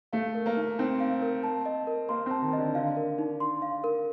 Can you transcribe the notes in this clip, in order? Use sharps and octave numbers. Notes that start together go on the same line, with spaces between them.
A3 F5
A#4
A#3
D#4
C4 D#4
F5
A#4
A5
D#5
A#4
A#3 C6
C4 A5
D#3
D3 D#5
D3 F5
A#4
D#4
C6
F5
A#4